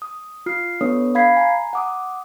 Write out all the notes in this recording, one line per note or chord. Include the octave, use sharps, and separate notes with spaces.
D#6
F4 F6 C7
B3 D4 A4 B4 C#5 D#6
F5 B5 G#6 B6 C7
G#5 A#5
F#5 D6 D#6